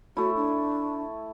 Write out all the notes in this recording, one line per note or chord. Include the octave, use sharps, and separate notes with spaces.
A3 E4 F#4
D4